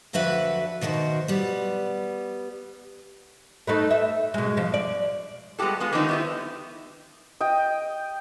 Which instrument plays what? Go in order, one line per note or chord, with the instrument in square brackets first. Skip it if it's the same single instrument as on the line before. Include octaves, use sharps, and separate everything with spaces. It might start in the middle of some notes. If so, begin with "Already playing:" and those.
[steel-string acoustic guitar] F2 D3 F#4 B4 E5 G#5
B2 D#3 F#4 A#4 C5
G3 B3
[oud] A3 D#4 B4
E5
B2 G#3
B2 F3
D5
[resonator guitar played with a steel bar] G3 G#3 B3 F#4 G4 A4
G#3 B3 F4 F#4
D3 D#3 F#3 A#3 C4 D#4
B3 E4 G4
[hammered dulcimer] D#5 G5